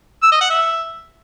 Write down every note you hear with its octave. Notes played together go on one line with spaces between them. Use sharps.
E6
D#5
F#5
E5